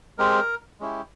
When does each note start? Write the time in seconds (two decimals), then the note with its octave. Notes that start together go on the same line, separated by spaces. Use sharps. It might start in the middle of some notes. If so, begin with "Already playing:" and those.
0.18 G#3 C4 G4 A#4
0.80 G#3 C#4 E4 G4